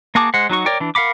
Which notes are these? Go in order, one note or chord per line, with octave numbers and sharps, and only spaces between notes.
A#3 F#4 G#4 A5 D6
G#3 C5 F#5
F#3 D#4 F#4 C#6
A#4 C#5 D5 G5
E3 D4
A#4 F5 F#5 B5 D6